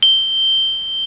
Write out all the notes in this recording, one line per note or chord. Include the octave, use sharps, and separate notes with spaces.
G7